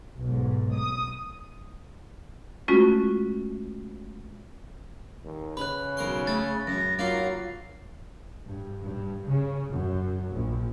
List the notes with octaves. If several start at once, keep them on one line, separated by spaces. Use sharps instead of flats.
B1 G#2
D#6
G#3 A3 C#4 F4 F#4
D#2
C#3 B4 B5 F#6
B1 A#4 C6
A3 A6
F#2 A#6
F#3 A#3 D#4 F4 F5
G2
G2
C#3
F#2
A#1